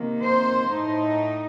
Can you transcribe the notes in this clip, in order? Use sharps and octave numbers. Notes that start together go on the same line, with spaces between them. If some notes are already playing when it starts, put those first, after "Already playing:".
Already playing: C3 D#3 A#3
C5
A2 A3 D#4